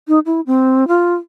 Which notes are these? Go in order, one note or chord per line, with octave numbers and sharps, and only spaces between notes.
D#4
E4
C4
F4